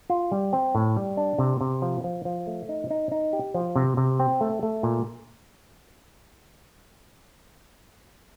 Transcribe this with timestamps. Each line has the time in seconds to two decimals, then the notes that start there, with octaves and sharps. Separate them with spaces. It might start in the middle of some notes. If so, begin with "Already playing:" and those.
0.10 F4
0.32 G3
0.53 C4
0.75 A2
0.97 G3
1.17 D4
1.39 C3
1.61 C3
1.82 F3
2.04 F3
2.25 F3
2.47 A3
2.69 D#4
2.90 D#4
3.12 D#4
3.33 G4
3.54 F3
3.76 C3
3.97 C3
4.20 C4
4.41 A3
4.63 A3
4.83 A#2